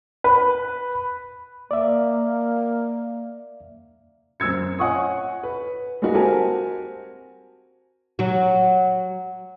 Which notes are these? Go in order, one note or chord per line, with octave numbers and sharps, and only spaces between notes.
B4
A#3 D5 E5
F#2 C4 E6 G#6 C#7
C#5 D#5 F#5 G#5 C#6 D#6
B4
G3 G#3 A#3 D#4 F#4
C4 F#4 G4 A#4 G#5 A5
F#3 F#4